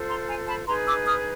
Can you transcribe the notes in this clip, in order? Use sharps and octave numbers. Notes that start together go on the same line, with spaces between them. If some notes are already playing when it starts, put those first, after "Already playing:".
Already playing: F4 A4 C5
A#5 C6
G#5 A#5
A5 B5
D#4 G#4 B4 A#5 C6
D6 E6
D#6 F6